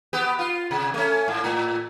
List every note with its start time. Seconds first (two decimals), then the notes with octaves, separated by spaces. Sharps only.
0.13 B3 G4
0.39 F4
0.71 C3
0.94 A3 C#4
1.28 G#2
1.44 A2